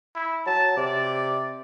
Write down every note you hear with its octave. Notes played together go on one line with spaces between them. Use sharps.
E4
F#3 A5
C3 D5